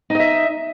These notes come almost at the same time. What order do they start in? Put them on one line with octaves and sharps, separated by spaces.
D#4 D#5 E5